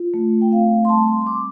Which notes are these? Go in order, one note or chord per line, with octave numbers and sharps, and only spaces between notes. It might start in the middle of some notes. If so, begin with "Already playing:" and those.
Already playing: F4
A3
G5
C4 F5
C6
G3 A5
C6
C6
C4 D6